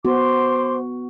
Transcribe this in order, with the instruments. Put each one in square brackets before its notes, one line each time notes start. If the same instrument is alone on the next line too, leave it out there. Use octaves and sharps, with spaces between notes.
[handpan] B3 F#4 [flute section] C5 C6 D6